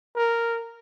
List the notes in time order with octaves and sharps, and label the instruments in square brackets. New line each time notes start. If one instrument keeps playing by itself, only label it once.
[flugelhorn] A#4